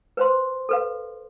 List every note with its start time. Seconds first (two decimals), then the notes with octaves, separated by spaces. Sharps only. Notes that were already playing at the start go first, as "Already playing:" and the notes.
0.17 B4 C5 C6
0.69 A4 B4 F5